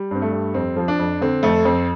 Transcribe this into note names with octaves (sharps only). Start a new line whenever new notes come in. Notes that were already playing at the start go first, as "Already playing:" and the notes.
Already playing: G3
G2 C4
A3
G3
F2 C4
F3
D4
F2
D3 C4
F2 A3
F2 C4